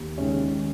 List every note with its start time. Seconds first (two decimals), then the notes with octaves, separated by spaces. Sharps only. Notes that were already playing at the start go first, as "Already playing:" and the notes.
Already playing: D#2
0.18 D#3 G#3 C#4